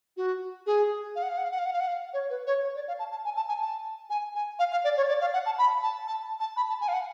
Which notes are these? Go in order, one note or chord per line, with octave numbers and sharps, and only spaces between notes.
F#4
G#4
F5
F#5
F5
F#5
F5
F#5
F5
F#5
F5
F#5
F5
C#5
B4
C#5
C#5
D5
F5
A5
A5
G#5
A5
G#5
A5
G#5
G#5
F5
F5
D5
C#5
D5
F5
F#5
A5
B5
A5
A5
A5
B5
A5
G#5
F5
F#5